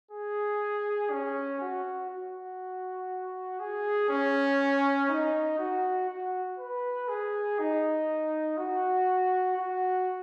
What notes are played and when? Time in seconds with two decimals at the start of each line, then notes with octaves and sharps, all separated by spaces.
0.11 G#4
1.11 C#4
1.61 F#4
2.10 F#4
3.59 G#4
4.09 C#4
5.09 D#4
5.58 F#4
6.09 F#4
6.58 B4
7.08 G#4
7.59 D#4
8.57 F#4
9.57 F#4